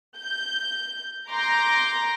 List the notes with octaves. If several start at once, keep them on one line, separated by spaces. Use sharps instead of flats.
G6
A#5 C6 D6 G6 A#6